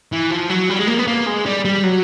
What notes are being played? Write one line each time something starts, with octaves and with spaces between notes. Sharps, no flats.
E3
F3
F#3
G3
G#3
A#3
B3
A#3
G#3
G3
G3
F#3